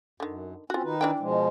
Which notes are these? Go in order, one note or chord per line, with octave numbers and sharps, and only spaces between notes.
F#2 D3 D#3
C4 C#4 F4 F#4
D#3 D#4 B4
E3 D4 G5
B2 F3 G#3